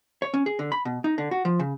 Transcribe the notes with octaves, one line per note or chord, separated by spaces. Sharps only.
C#5
C#4
G#4
D3
B5
B2
D#4
D3
F#4
F3
C#3